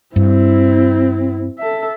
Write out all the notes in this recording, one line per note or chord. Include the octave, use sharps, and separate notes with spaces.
G2 C4 E4
A4 E5